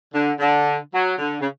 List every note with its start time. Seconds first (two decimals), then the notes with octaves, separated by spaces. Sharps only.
0.14 D3
0.40 D3
0.93 F#3
1.19 D3
1.41 C#3